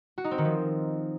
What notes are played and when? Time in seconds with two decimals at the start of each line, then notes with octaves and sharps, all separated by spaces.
0.18 F#4
0.24 D#4
0.31 C4
0.38 D#3
0.45 F3